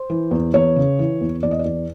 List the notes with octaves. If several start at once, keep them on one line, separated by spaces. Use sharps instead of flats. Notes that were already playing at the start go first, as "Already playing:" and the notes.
Already playing: C5
E3
E2
E2 C#5
C#3
E3
E2
E2 D5
D#5
D5
E2